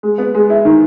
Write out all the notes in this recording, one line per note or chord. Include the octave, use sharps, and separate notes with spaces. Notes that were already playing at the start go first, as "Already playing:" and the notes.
G#3
B3
G#3
E4
D#3